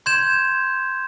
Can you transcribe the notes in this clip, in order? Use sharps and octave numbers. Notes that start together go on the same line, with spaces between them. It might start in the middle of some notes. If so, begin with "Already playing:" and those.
C6 G6 G#6 E7